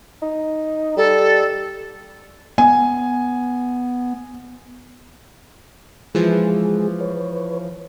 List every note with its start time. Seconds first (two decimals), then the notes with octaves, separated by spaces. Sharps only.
0.22 D#4
0.97 G3 A4
2.58 B3 G#5
6.15 E3 F3 G#3 G#4
7.01 B4 C#5